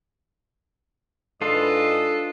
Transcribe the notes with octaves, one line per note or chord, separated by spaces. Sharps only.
G#2 D4 F4 A4 B4 D#5